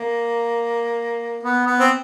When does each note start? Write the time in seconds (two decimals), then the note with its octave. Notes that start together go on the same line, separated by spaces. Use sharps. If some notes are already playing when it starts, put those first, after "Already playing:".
Already playing: A#3
1.43 B3
1.66 B3
1.80 C4